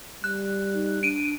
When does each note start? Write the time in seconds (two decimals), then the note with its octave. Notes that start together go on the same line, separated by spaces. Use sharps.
0.24 G3 F#6
0.74 D#4
1.03 D4 D7 D#7